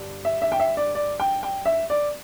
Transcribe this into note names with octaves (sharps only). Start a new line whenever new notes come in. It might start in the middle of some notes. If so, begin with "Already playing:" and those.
Already playing: G2 D3 G3
E5
E5
G5
E5
D5
D5
G5
G5
E5
D5